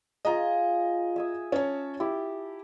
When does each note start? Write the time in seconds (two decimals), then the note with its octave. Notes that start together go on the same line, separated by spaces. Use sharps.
0.25 F4 G#4 D#5 A#5
1.16 E5 G#5 D#6
1.52 C#4 C#5 A5
2.00 E4 G4